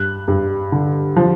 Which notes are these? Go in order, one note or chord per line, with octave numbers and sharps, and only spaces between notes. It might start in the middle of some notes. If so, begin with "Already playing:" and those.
Already playing: G2 F#6
G2
D3
F3